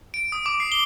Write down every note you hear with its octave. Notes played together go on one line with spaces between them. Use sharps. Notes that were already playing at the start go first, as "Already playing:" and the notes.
D7
D#6
D6
C7
G7